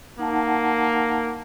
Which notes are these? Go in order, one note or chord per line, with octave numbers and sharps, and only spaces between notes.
A#3 D#4 F#5 A5